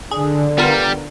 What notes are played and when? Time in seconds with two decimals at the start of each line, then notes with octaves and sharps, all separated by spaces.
0.11 D3 G#4
0.58 G3 B3 F4 A#4